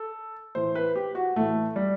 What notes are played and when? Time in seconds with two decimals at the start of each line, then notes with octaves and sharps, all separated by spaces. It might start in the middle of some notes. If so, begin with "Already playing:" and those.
Already playing: A4
0.55 A2 E3 C5
0.75 B4
0.96 G4
1.15 F#4
1.36 A2 E3 A3
1.76 G3